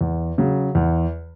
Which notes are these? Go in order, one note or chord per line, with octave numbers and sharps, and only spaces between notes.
E2
C#3 F#3
E2